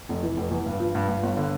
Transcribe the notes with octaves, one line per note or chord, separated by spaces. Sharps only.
F1
E3
F1
E2
G2
F3
G2
G2
G1
D3